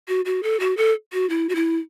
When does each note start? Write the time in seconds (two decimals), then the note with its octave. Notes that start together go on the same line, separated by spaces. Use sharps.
0.08 F#4
0.25 F#4
0.43 A4
0.60 F#4
0.77 A4
1.13 F#4
1.30 E4
1.49 F#4
1.55 E4